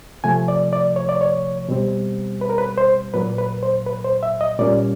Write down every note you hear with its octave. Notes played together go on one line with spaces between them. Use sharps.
C3 F3 A3 G#5
D5
D5
C#5
D5
C#5
B2 G3 C4
B4
A#4
B4
C5
A#2 F#3 A#3 B4
B4
C5
B4
C5
E5
D#5
A#2 G3 A#3 C#4 D5